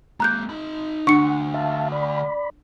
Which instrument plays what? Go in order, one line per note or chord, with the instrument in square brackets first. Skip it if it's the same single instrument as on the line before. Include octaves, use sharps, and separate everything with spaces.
[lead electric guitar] G#3 A#3 [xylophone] A#5 F#6 G6
[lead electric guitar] D#4 B5
[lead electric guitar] D2 [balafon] D4 [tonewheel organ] F#5 [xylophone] C#6 C#7
[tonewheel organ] E5 F5 A5
D5 B5